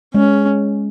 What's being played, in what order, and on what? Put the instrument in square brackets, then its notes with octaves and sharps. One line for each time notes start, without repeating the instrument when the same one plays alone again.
[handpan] G#3 [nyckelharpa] C#4